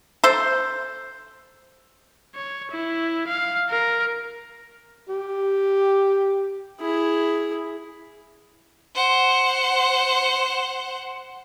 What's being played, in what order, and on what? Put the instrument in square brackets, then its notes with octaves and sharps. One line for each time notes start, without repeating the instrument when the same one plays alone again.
[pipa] A4 C5
[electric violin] C#5
E4
F5
A#4
[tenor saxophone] G4
[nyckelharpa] E4 G#4
[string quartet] C5 F#5